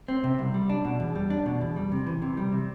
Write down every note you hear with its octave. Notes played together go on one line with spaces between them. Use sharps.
C4
C3
C2
G3
D4
B2
E2
G3
D4
B2
E2
G3
C3
E3
C3
G3
C3